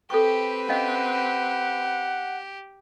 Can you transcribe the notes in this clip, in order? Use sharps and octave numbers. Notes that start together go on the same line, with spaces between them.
C4 G4 A4 B4 G5 C#6
C#4 G4 D#5 F5 F#5